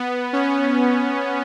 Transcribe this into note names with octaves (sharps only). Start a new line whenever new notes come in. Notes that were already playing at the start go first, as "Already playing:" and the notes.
Already playing: B3
C#4